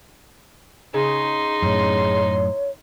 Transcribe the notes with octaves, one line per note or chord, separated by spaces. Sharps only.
C#3 D#4 C6
F#2 A2 C#5